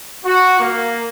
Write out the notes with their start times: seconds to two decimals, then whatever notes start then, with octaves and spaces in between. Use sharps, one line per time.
0.24 F#4
0.59 A#3